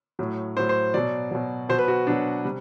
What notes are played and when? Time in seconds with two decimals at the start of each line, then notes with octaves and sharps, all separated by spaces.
0.19 A2 F#3
0.56 A2 C5
0.59 F#3
0.69 C5
0.94 B2 F#3 D5
1.31 B2 F#3
1.69 B2 F#3 C5
1.79 B4
1.88 F#4
2.07 B2 F#3 D4
2.45 C3 G3